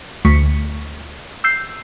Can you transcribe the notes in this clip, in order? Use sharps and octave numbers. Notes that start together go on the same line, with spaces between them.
D2 C#6 B6 C#7
E6 G6 C7